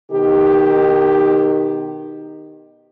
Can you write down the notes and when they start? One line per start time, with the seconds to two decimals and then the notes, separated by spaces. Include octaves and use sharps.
0.11 B2 D#3 D#4 G4